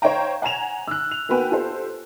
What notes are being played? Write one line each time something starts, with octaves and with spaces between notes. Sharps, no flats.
C5 C#5 F5 G5 A#5
F#5 G#5 A#5 G#6 E7 F7
E6 F#6
F7
A#3 B3 F#4 B4 G5 G#5
F4 G4 A4 C5